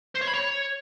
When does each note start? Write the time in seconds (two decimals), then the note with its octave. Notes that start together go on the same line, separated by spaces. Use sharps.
0.15 C5
0.22 C#5
0.28 B5
0.34 C#5